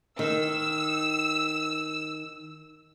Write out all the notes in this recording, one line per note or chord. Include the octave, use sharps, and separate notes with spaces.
D#3 E6